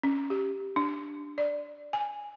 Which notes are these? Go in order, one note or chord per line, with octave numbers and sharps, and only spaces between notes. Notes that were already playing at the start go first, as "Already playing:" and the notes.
C#4
G4
D4
D5
G#5